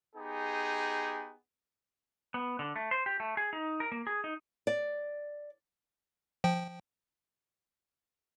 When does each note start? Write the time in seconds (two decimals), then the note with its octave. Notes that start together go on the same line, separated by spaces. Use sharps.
0.16 B3 D#4 G4 G#4
2.34 B3
2.59 D3
2.76 A3
2.91 C5
3.06 G4
3.20 A3
3.37 G#4
3.53 D#4
3.80 A#4
3.92 A#3
4.07 G#4
4.24 D#4
4.67 D5
6.44 F3 G5